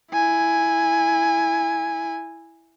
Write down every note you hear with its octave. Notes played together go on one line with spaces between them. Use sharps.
E4 G#5